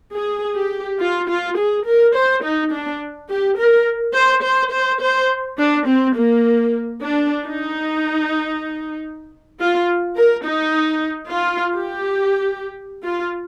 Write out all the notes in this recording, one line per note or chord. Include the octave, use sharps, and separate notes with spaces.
G#4
G4
F4
F4
G#4
A#4
C5
D#4
D4
G4
A#4
C5
C5
C5
C5
D4
C4
A#3
D4
D#4
F4
A#4
D#4
F4
G4
F4